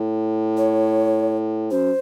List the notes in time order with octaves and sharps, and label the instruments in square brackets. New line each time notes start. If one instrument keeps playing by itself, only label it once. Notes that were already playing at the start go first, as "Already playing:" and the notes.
Already playing: [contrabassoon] A2
[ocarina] C#5
[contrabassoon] F#2 [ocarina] C5